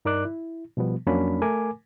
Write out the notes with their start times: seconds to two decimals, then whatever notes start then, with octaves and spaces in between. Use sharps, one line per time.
0.05 G2 D#4 A#4 D5 D6 F#6
0.25 E4
0.77 B2 F3 G3 B3
1.07 F2 F#3 A#3 C#4 D4 B5
1.42 A3 A#4 G#5 D6